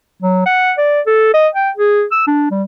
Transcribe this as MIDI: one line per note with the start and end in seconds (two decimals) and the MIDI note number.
0.23 0.43 54
0.46 0.72 78
0.78 1.01 74
1.06 1.30 69
1.34 1.48 75
1.55 1.70 79
1.77 2.03 68
2.11 2.26 88
2.27 2.46 62
2.51 2.63 55